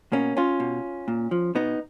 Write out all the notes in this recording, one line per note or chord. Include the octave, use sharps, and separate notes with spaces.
B2 A#3 C#4
C#4 F4
B2
A#2
F3
B2 B3 D#4